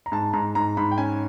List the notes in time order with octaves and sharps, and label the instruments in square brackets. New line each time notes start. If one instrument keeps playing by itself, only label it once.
[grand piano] A#5
G#2 A5
G#2 A#5
G#2 A#5
G#2 B5
G5
C#4 G#5